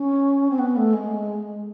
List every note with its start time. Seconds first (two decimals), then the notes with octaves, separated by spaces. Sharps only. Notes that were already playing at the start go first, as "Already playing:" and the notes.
Already playing: C#4
0.50 C4
0.59 B3
0.76 A3
0.93 G#3